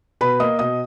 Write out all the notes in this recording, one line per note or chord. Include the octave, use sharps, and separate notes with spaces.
B2 B4 B5
A#3 D#5 D#6
B2 D#5 D#6